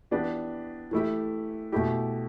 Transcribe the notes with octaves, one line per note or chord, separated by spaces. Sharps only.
E3 B3 D4 G4
E3 A3 E4 G4
B2 A3 E4 G4